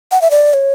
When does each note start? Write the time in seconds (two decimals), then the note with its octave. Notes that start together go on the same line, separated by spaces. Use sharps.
0.12 F#5
0.22 E5
0.31 D5
0.54 C#5